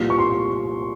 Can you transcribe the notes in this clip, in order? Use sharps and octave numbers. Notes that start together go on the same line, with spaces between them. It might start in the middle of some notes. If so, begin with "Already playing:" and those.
Already playing: C2 A#2 F3
C#6
C6